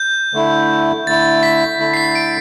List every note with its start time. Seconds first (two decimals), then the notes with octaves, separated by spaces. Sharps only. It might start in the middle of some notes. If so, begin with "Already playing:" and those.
Already playing: G6
0.34 D3 A3 E4
1.06 D3 A3 E4 A6
1.43 B6
1.79 D3 A3 E4
1.93 C7
1.97 B6
2.15 D7